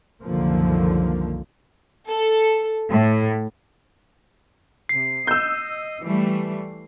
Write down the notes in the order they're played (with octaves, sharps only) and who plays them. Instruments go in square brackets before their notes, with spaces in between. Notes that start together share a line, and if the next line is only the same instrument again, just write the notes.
[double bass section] C2 F#2 D3 D#3 F3 A#3
[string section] A4
A2
[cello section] C3 [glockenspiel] C7
[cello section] D#5 [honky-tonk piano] E6 G6
[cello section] E3 G3 A3